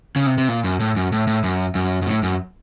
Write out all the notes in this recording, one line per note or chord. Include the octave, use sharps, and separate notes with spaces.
C#3
C3
C3
A#2
F#2
A2
F#2
A2
A2
F#2
F#2
F#2
A2
F#2